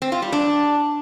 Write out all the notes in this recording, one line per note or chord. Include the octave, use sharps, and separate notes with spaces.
C4
F4
G3
D4